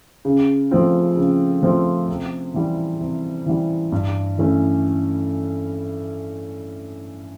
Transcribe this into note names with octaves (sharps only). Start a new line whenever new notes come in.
C#3
F3 A3 C4 F4
C#3
F3 A3 C4 F4
C3
E3 G3
C3
E3 G3
G2
E3 A3 C#4